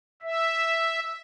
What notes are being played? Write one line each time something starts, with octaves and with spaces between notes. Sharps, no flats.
E5